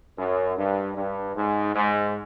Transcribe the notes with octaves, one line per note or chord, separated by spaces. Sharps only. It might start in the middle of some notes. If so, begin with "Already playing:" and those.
F#2
G2
G2
G#2
G#2